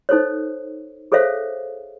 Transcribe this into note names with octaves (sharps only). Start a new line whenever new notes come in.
D#4 A4 C5 C#5
G#4 A4 C5 C#5 E5 F5